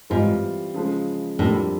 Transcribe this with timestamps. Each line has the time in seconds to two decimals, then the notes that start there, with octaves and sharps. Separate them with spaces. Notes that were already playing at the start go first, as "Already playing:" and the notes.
0.10 G#2 E3 G3 C4 F4
0.74 C#3 F3 G#3
1.39 F2 A2 D3 G3 A#3